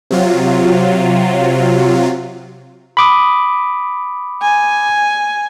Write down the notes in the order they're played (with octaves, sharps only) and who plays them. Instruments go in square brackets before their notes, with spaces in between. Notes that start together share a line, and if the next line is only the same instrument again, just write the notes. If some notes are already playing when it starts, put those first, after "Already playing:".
[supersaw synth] C3 F#3 F4
[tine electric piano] B5 D6 D#6
[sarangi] G#5